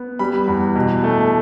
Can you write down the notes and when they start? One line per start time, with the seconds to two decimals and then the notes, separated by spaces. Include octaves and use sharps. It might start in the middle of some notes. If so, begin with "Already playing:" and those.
Already playing: B3
0.19 G3 B5
0.48 E2
0.76 B2
1.04 A3